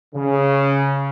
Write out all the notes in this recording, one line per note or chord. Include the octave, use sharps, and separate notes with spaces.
C#3